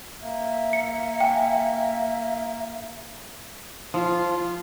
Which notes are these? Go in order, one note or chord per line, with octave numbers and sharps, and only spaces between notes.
A#3 E5
C#7
G5 G#5
F3 F4